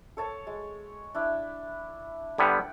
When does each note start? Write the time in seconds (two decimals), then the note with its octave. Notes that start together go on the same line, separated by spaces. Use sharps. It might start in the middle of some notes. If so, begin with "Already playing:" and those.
0.17 A4 C#5 A5
0.47 G#3
1.15 D4 E4
2.38 D3 G3 B3 F#5 G5